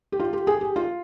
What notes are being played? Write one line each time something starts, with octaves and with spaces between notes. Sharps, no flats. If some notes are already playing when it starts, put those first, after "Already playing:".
G4
F4
G4
G#4
G4
F4